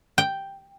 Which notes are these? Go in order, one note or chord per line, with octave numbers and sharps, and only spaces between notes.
G5